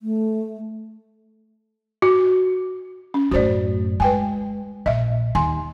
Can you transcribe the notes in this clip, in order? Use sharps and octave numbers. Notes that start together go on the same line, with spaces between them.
A3
F#4
C#4
F#2 A2 F#4 C5 D5
G#3 B4 G5 G#5
A#1 D#5 E5
D#2 G#5 C6